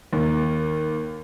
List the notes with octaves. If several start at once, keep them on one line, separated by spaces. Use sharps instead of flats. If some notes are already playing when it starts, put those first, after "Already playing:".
D#2